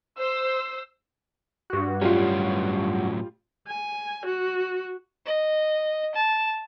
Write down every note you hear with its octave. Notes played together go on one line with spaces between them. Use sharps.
C5 E6
G2 F#4
A2 F#3 G3 C#4 F4
G#5
F#4
D#5
A5